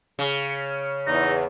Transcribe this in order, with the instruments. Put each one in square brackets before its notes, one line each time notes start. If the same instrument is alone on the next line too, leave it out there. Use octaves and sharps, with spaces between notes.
[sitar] C#3
[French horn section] E2 [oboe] D#4